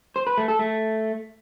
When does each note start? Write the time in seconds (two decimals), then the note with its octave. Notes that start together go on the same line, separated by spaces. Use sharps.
0.16 C5
0.27 B4
0.37 A3
0.48 A4
0.59 A3